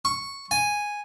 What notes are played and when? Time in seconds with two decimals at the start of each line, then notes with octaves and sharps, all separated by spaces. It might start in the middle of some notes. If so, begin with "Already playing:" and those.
0.05 C#6
0.51 G#5